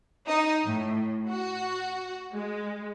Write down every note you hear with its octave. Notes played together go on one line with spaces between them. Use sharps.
D#4
A2
F#4
G#3